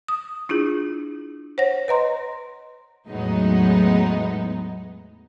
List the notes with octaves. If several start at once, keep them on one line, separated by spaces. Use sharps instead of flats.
D#6
D4 E4 F4 G#4
C5 C#5 F#5 A#6
B4 D#5 A#5 C6
E2 A2 F#3 G#3 B3 D#4